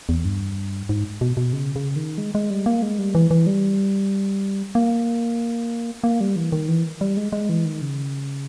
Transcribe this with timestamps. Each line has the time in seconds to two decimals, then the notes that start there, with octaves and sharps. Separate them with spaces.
0.09 E2
0.25 G2
0.89 G#2
1.21 B2
1.37 B2
1.53 C#3
1.76 C#3
1.96 D#3
2.18 G#3
2.35 G#3
2.50 G3
2.66 A#3
2.82 G#3
2.99 G3
3.15 E3
3.31 E3
3.47 G3
4.75 A#3
6.04 A#3
6.21 G3
6.36 E3
6.52 D#3
6.68 E3
7.01 G3
7.17 G#3
7.33 G#3
7.49 E3
7.65 D#3
7.82 C#3